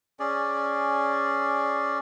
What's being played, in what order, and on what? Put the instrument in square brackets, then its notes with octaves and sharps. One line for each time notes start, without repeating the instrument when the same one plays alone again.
[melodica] C#4 G#4 D5